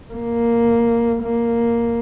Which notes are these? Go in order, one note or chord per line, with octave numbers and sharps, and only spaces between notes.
A#3
A#3